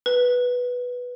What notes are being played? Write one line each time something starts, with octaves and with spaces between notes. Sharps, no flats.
B4